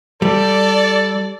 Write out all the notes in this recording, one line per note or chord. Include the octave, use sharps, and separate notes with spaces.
G3 A4 D5